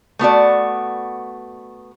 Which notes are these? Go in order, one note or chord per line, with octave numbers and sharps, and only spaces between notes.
A3 B3 F#4 D5